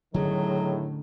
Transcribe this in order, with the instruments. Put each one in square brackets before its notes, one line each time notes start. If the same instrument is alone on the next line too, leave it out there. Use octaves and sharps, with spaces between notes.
[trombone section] A2 D#3 [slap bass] D3 A3 C#4 [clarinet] F#3 [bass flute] G#4